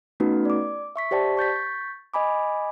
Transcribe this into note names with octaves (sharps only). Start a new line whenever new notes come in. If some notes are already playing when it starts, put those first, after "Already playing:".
A3 B3 C#4 D#4 F#4 B4
D5 D6
E5 C#6 B6
G4 C5 D5 G5 A5
C#6 G6 A6 B6
D#5 G#5 B5 D6